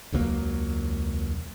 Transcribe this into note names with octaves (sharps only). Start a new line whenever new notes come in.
E1 C#2 F#3 A#3